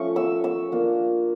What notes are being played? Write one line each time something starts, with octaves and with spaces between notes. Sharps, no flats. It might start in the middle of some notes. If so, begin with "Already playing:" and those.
Already playing: F3 A3 C#4 C#6
E6
E6
A#3 D4 F4